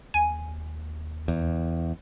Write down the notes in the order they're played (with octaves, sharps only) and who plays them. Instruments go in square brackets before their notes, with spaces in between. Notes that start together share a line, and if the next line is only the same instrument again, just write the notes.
[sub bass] D#2 [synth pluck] G#5
[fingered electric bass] E2